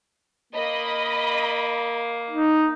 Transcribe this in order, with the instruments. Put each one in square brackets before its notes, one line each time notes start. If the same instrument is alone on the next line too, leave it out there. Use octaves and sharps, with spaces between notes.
[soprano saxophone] A#3 [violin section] D#5 B5
[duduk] D#4